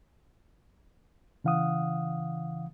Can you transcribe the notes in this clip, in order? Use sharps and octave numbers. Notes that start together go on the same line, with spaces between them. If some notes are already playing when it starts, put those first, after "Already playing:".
C#3 E3 F5 F#5 D#6